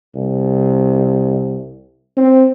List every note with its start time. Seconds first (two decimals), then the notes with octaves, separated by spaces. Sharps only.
0.16 C2
2.17 C4